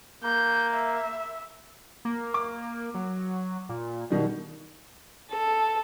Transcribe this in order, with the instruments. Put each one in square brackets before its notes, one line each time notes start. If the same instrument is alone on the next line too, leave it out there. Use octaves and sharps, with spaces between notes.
[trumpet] A#3 [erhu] G6
[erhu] E5
[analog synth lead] A#3
[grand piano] D6
[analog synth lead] F#3
A#2
[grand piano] B2 D#3 G3
[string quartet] A4